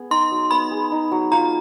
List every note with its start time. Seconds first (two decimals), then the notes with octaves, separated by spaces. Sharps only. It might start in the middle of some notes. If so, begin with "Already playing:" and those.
Already playing: B3 G#4
0.11 D#4 C6
0.31 F#3
0.51 B3 B5
0.71 G#4
0.92 D#4
1.11 F#3
1.32 F4 A#5